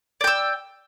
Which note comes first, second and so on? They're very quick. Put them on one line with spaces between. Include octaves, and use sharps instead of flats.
D5 G5 E6